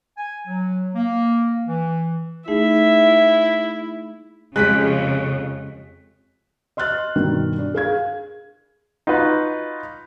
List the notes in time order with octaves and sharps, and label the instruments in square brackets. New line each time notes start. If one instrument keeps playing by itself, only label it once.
[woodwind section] G#5
F#3
A#3
E3
[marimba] A3 D#4 G#4 [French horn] E4 [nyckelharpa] E5
[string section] F2 C#3 [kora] G#3 G4 [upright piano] F#6 B6
[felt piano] D#5 C6 F6 F#6 A6
G2 B2 D#3 C4
D4
G#4 F5 G#6
[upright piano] D#4 F4 F#4 B4